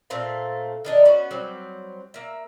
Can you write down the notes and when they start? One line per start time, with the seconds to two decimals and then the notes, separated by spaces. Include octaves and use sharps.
0.10 A#2 A3 C4 F5
0.85 D#3 D4 D#4
1.05 B3 C#4 F#4
1.31 F#3 G3 C4
2.14 A#3 E5